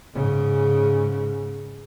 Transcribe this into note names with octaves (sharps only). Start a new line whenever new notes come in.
G#2 C#3